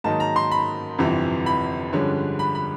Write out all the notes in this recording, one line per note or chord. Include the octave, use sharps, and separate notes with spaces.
G#2 D#3 F#3 A#3 D#4 A5
A#5
C6
B5
G1 F2 C3 E3
B5
G2 D3 F3 G#3 C#4
B5
B5